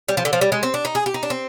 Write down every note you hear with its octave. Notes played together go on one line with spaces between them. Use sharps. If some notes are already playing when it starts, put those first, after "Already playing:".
G3
F3
D3
F3
G3
G#3
C4
D4
D#4
G#4
G4
D#4
D4
C4